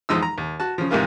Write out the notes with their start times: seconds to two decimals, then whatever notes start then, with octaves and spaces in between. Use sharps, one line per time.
0.09 E2 F3 G#3 D#4 E6
0.23 A#5
0.38 D#2
0.60 F#4 A5
0.78 C#3 F3
0.91 G#2 C3 D#3 E3 A#3 F4